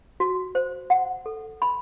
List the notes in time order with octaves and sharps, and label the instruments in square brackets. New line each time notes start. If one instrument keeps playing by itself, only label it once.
[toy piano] F#4
C5
F#5
A4
B5